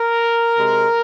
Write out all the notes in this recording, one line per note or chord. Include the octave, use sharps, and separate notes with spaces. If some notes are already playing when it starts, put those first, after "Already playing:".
Already playing: A#4
C3 G#3